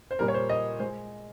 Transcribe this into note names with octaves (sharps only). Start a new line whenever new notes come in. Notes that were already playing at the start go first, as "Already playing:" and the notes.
C5
A#2 G3 A#3 A#4
C#5
C5
D#5
G#3 C5